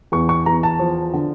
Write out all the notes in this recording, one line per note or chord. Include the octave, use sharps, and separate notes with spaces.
E2 C#6
C#6
E2 A#5
A5
F3
D3